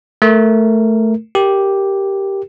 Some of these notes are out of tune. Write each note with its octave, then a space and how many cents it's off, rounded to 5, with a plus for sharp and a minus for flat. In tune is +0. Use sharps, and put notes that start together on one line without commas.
A3 +0 A#4 +0
G4 +0 A#4 +0